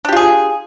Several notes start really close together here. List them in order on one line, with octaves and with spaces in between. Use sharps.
D4 G4 F4 G#4